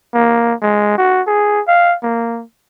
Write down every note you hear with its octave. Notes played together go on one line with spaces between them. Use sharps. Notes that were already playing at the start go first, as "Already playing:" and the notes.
A#3
G#3
F#4
G#4
F5
A#3